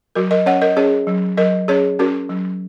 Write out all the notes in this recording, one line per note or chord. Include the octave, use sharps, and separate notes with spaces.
F#3 F#4 A#4
A#4 D#5
C#4 C#5 F#5
A#4 D#5
C#4 G#4 C#5
F#3
F#3 A#4 D#5
C#4 G#4 C#5
C#4 F#4 A#4
F#3